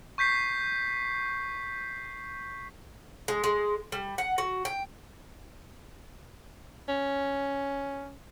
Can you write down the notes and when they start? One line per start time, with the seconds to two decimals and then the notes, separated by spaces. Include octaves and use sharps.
0.18 C#6 G6 B6 C7
3.28 G#3
3.44 G#3
3.92 G3
4.18 F#5
4.38 F#4
4.65 G5
6.89 C#4